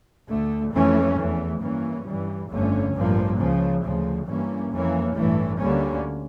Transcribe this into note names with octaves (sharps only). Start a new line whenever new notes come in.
D2 D3 A3
F2 E3 A3 C#4
E2 E3 A3
G2 E3 A#3 C#4
G2 E3 G3
G1 F2 D3 A3 C#4
A1 G2 F3 A#3
C#2 C#3 F3
D2 C#3 F3
G2 E3 G3 A#3 C#4
F2 E3 A#3 C#4
A1 G2 E3 A3
D2 D3 G3 A#3 C#4